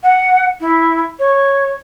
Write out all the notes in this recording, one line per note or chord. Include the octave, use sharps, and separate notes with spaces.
F#5
E4
C#5